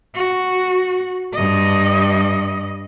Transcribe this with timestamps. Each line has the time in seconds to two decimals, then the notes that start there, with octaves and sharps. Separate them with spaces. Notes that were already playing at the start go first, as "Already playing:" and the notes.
0.16 F#4
1.33 G2 D#5